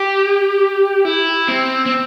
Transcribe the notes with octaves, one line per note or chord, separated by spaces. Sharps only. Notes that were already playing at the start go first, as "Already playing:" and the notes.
Already playing: G4
E4
C4
C4